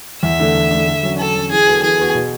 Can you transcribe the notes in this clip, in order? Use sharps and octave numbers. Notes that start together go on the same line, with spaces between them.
E2 E5
D3 A3 D4
E2
D3 A3 D4
D3
F#3 C#4
D3 A4
F#3 C#4
E3 G#4
B3 F#4 A4
E3 G#4
B3 F#4 A4
B2